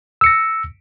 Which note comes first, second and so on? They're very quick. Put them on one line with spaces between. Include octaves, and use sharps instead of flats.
E6 C#7 A#6